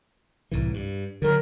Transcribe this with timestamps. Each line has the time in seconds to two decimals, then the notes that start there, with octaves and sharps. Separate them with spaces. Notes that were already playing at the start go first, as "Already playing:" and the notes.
0.52 C2 A2 E3
0.74 G2
1.22 D3 F#3 A#4